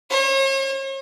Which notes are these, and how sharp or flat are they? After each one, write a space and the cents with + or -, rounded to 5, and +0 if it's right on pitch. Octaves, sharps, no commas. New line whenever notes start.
C#5 -40